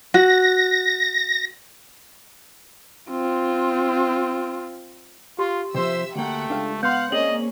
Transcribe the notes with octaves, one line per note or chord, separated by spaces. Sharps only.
F#4 A#6
C4 F4
F4 G4 C6
C3 D#3 F3 C5 E5 E6
D2 A3 A#3 F#5 G5
C#2 D4 A4 F5
B3 F5 F#5 C6 G6
A#3 C4 C#4 G#4 D5 D#5 F#7